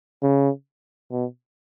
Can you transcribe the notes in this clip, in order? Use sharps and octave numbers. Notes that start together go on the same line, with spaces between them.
C#3
B2